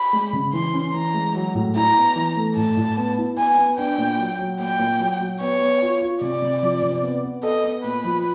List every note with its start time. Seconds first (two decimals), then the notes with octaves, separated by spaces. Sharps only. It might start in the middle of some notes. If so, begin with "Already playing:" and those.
Already playing: B5
0.13 G#3
0.33 C#3
0.53 E3 C6
0.74 C#4
0.94 E3 A#5
1.14 G#3
1.34 F#3
1.55 A2
1.75 E4 A#5
1.95 B3
2.16 E3
2.36 A3
2.56 A2 A5
2.77 A2
2.97 B3
3.17 E4
3.37 B3 G#5
3.58 B3
3.78 D4 G5
3.98 A#2
4.19 F#3
4.39 F#3
4.59 A#2 G5
4.79 A#2
5.00 F#3
5.20 F#3
5.41 B3 C#5
5.60 B3
5.81 F4
6.02 F4
6.21 C3 D5
6.42 C3
6.62 F3
6.82 C3
7.03 B3
7.23 B3
7.43 A4 D#5
7.64 B3
7.83 A#2 B4
8.04 F3